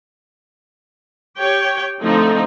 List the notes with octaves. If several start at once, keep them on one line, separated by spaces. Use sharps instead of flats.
G4 C#5 G5
D3 F3 A3 C4 D#4